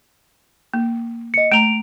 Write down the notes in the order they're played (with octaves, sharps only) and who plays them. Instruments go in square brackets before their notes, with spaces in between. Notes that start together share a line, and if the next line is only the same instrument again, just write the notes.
[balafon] A#3
[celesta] D#5 C#7
[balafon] A3 A#5 [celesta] D7 F7